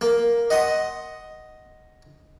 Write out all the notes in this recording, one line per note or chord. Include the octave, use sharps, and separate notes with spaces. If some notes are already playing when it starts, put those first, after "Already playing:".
A#3
D#5 F#5 C6 D#6